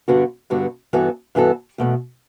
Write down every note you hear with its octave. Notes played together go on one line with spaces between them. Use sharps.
G2 D3 G3 B3 F#4
G2 D3 G3 B3 F#4
G2 E3 B3 F#4 A4
G2 E3 B3 F#4 A4
E2 B2 A3